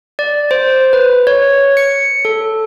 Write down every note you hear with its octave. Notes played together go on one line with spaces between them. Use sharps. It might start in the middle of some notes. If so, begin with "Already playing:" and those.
D5
C5
B4
C#5
C#7
A4